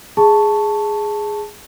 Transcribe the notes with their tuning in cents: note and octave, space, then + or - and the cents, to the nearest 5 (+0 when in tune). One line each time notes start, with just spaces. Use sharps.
G#4 +0 A5 +0 C#6 +0